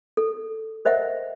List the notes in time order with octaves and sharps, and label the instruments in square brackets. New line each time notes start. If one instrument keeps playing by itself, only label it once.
[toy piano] A4
A#4 C5 D#5 E5 F#5